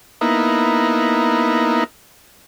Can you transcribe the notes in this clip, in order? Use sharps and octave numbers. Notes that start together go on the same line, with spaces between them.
A#3 B3 D#4 E4